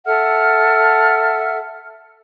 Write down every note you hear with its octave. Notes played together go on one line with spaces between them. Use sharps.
A4 E5 F#5 F6